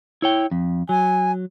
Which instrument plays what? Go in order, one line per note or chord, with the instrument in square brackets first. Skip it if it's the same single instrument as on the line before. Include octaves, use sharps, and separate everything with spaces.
[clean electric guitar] E4 C#5 G5
F2
[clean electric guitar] F#3 [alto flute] G#5